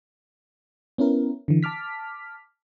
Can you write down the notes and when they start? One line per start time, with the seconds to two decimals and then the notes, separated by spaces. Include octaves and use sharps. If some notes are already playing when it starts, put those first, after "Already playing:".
0.98 B3 C#4 E4 A#4
1.48 D3 E3
1.63 A5 D6 F6 B6